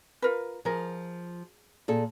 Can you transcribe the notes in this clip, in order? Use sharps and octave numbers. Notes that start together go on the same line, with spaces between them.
F4 A#4 B4
F3 G#4 A#4
A#2 G#4 A4